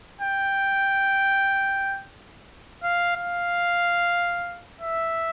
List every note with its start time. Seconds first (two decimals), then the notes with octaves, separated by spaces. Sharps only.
0.21 G5
2.83 F5
3.16 F5
4.81 E5